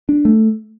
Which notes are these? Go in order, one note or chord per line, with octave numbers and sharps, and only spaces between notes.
D4
A3